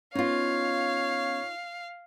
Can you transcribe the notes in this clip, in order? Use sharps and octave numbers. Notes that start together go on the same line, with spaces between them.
B3 C#4 D#4 F4 C#5 F5